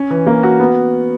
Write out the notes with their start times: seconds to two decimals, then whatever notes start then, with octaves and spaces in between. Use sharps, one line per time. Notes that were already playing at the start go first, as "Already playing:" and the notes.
Already playing: C#4
0.11 E3
0.27 A#3
0.43 F#4
0.60 B3